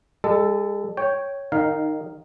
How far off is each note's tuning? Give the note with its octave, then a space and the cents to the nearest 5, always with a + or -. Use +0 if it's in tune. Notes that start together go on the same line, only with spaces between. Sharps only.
G#3 -40 A4 +0
C#5 +0 G5 +0
D#3 -20 D#4 +0 F5 +0